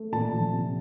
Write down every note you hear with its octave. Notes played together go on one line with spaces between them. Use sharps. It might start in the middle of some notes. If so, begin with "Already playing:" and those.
Already playing: A3
A#2 A5
F3
C3